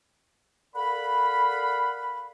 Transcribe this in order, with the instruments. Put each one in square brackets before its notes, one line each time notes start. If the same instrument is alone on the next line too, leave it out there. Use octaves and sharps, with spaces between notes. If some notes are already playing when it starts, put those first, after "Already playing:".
[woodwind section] A4 A#4 D5 F5 F#5 B5